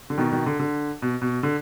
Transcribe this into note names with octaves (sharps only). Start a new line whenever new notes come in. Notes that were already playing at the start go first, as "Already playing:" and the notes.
D3
B2 D#3
B2 D#3
D3
D3
B2
B2
D3